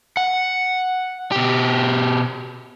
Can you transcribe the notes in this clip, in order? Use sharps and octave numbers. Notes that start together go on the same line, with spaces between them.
F#5
B2 G4